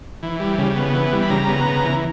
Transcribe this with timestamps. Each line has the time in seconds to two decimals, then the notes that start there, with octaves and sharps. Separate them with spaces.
0.23 E3
0.40 G3
0.58 C#3
0.76 B3
0.94 E3
1.13 G3
1.23 B5
1.30 C#3 A#5
1.48 B3
1.66 C#3
1.84 E3